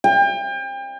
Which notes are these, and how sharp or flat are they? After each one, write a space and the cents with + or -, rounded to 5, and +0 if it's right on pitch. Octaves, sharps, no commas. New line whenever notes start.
G5 +35